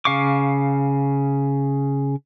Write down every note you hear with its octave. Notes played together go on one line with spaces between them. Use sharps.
C#3 F5 C#6 D6